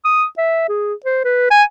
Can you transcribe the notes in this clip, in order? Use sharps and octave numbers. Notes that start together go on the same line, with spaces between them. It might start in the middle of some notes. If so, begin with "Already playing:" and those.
D#6
E5
G#4
C5
B4
G#5